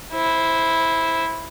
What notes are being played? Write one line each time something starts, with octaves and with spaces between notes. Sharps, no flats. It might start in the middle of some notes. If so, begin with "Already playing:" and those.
E4 C5